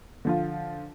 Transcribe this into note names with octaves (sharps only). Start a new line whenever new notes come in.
D3 F3 F4